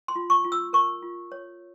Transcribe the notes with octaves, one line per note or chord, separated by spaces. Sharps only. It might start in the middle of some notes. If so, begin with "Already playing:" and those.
C6
F4
C#6
F4
E6
A#4 C#6
F4
C#5